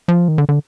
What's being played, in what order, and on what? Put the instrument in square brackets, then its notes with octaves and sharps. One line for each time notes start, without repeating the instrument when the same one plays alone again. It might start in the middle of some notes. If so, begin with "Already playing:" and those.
[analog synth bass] F3
D#3
D3
D3